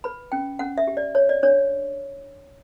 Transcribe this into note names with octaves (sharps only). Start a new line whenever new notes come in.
B4 B5
C#4 G5
C#4 F#5
E5
G4
D5
C#5
D5
D4 C#5